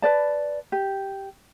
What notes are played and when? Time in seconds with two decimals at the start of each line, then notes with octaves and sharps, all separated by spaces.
0.02 B4 D5 A5
0.72 G4